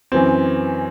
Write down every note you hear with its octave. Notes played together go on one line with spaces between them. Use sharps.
F#2 E3 C4